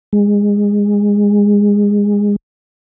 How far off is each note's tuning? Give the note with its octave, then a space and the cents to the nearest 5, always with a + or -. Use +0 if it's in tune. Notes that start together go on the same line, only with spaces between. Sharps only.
G#3 -20